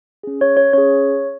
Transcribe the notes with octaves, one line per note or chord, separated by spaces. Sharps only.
C#4 G#4
C#5
C#5
C#4 G#4 C#5